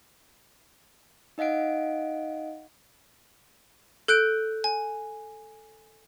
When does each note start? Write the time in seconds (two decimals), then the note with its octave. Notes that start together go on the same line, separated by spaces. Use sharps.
1.38 D#4 D#5 F5 F#5 D7
4.08 A4 F#6 G6 D7
4.64 G#5